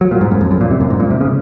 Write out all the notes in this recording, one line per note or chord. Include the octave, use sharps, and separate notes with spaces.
F#3
A#2
G#2
F#2
F2
F#2
A#2
C3
F#2
G#2
A#2
C3
C#3